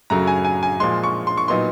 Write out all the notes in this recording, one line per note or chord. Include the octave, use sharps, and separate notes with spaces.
F#2 C#3 F#3 A3 A#5
G#5
G#5
G#5
A#2 F3 G#3 C6
C#6
C6
C#6
A#2 F#3 B3 D#4 C6